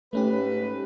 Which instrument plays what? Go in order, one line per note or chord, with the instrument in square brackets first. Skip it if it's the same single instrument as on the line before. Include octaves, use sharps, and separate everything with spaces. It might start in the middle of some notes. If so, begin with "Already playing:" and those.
[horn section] G#2 B4 [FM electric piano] A3 C#4 G4